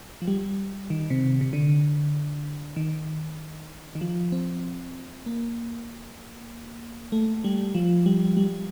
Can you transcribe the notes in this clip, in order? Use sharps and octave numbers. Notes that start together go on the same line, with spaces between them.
F3
G3
D#3
C3
C3
D3
D#3
D#3
F3
C4
A#3
A3
G3
F3
G3
G3